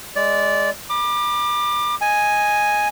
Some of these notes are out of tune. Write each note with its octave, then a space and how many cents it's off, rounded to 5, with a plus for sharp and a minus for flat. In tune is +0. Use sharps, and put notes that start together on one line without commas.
G#3 +0 D5 -15
B5 -35 D6 +25
D#5 +0 G#5 +0